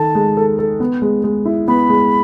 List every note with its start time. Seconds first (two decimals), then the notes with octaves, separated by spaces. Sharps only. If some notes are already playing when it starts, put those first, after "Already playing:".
Already playing: D#3 D#4 A4 A5
0.15 G#3
0.37 A4
0.58 A4
0.80 B3
1.02 G#3
1.24 G#3
1.45 E4
1.68 B3 B5
1.89 G#3